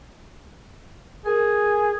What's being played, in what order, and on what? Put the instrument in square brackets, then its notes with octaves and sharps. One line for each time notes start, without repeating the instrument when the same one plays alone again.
[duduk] G#4 [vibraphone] A#4 G#5